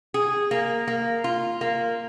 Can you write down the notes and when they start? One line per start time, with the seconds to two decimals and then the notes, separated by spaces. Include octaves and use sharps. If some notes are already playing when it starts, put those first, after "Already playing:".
0.14 G#4
0.51 A#3
0.88 A#3
1.24 F4
1.61 A#3